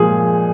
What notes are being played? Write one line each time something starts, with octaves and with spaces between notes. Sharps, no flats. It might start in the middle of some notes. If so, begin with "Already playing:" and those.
Already playing: A#2 F3 G#3 G#4